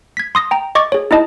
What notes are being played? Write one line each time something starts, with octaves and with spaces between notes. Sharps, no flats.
G#6 B6
C6 D#6 A#6
G5 A#5
D#5 C#6 D6 A6
G#4 C#5
D#4 E4 D#5 A5